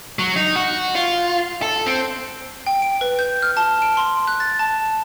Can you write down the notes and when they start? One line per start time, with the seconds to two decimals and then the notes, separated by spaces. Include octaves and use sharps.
0.19 F#3
0.36 D#4
0.55 F#4
0.95 F4
1.62 A4
1.86 C4
2.67 G5
2.82 D7
3.01 B4
3.19 G6
3.42 F6
3.57 A5
3.82 D7
3.97 C6
4.27 F#6
4.40 A6
4.59 A5